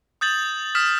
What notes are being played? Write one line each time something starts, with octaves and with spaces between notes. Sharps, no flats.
D#6 G6 A6 F#7
D#6 F6 B6 E7